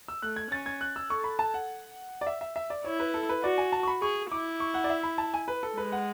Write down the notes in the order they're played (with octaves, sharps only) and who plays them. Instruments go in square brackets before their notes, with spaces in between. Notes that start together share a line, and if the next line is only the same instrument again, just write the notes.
[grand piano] E6
[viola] A3 [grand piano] F#6
[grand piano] G#6
[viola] C#4 [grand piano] A6
[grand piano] G#6
F#6
E6
[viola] A4 [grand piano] C#6
[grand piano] B5
A5
F#5
D5
E5
E5
E5
D5
[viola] E4 [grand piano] C#5
[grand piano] B4
A4
B4
[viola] F#4 [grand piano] D5
[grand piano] G#5
A5
C#6
B5
[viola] G#4 [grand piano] C#6
[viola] E4 [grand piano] D6
[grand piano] C#6
F#5
D5
E5
B5
A5
G#5
B4
A4
[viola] G#3 [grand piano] B4
[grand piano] F#5